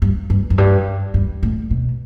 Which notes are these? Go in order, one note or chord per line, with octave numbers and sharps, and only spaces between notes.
G2
G2
F#2
G2
G2
A2
B2